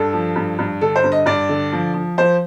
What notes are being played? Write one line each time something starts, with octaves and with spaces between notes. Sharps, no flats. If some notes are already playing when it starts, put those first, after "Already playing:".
Already playing: G2 A4
F3
G2
G2
D3 A4
C5
G2
D#5
G2 D5
D3
F3
F3
F3 C5